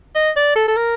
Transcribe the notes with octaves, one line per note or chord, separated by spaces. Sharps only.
D#5
D5
A4
A4
A#4